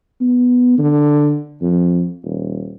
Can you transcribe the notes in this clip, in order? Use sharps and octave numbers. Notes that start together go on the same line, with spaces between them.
B3
D3
F2
D#1